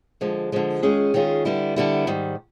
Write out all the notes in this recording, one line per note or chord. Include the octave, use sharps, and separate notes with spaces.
D3 F3 G#3
D3 F3 G#3
D#3 G#3 C#4 F4 G#4
D#3 G#3 C#4 F4 G#4
D3 G3 B3 E4
D3 G3 B3 E4
G#2 D#3 G3